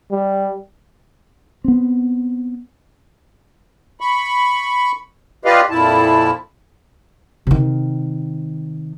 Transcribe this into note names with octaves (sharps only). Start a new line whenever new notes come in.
G3
B3 C4
B5 C#6
F4 G4 B4 D5 D#5 F5
F2 A#2 E4 A5
C3 D#3